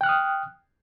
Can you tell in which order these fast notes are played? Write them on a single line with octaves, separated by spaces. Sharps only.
G5 F#6 F6 D#6